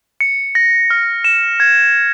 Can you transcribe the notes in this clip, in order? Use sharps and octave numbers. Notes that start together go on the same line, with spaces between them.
C#7
A#6
F6
E7
G#6